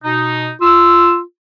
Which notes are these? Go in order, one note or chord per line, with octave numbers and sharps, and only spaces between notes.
B2 D#4
F4 E6